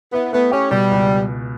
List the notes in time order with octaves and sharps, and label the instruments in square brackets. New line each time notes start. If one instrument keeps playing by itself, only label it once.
[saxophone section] B3 [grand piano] E4
[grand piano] A3 [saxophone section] B3
[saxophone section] C#4 [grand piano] G4
[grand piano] B2 [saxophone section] G3
[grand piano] C#2